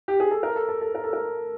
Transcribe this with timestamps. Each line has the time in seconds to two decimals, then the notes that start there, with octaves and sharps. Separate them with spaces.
0.08 G4
0.20 G#4
0.31 A4
0.43 A#4
0.56 A4
0.69 A4
0.81 A4
0.95 A#4
1.04 A4
1.13 A#4